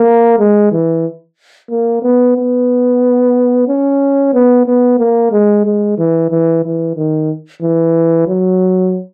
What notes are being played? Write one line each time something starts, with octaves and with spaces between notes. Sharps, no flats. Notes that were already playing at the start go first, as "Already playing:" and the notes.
Already playing: A#3
G#3
E3
A#3
B3
B3
C#4
B3
B3
A#3
G#3
G#3
E3
E3
E3
D#3
E3
F#3